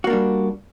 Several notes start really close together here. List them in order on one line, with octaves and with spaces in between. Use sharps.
F#4 A#3 D4 G3